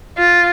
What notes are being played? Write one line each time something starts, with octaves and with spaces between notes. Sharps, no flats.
F4